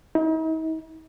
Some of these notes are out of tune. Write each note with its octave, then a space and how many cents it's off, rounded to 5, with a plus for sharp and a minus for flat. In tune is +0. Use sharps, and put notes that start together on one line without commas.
D#4 +45